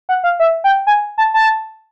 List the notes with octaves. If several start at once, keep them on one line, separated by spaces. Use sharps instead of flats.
F#5
F5
E5
G5
G#5
A5
A5